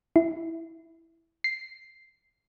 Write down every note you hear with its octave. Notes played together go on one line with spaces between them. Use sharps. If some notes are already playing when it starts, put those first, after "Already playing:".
E4
C7